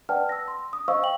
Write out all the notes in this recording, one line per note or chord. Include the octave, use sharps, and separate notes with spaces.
B4 D5 F#5 G5 A5 F6
E6 A#6
C6
D#6
C5 D#5 F5 C#6 E6
F5 G5 F#7